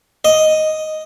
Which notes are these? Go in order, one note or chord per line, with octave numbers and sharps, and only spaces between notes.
D#5